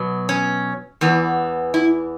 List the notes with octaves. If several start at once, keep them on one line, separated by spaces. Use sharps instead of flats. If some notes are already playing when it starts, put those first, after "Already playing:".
Already playing: B2 F#3 B3
C#4
E2 E3 B3
E4